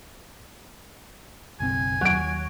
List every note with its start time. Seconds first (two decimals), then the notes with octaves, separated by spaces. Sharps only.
1.60 F#1 B1 C4 G#5
2.01 D#2 F#3 F#5 D7